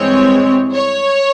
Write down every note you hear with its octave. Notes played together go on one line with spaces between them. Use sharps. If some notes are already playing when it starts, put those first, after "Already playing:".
Already playing: G2 E3 G#3 C4 C#5
C#5